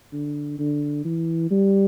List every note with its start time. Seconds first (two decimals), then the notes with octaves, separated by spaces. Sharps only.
0.13 D3
0.58 D3
1.05 E3
1.50 G3